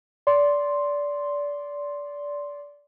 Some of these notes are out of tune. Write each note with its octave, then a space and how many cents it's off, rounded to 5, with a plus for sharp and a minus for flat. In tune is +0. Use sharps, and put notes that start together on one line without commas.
D5 -20 C6 +0